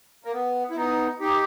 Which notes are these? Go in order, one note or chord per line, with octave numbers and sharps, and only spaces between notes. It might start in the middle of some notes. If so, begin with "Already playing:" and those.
A#3
B3
E4
B3 D#4
D#4 G4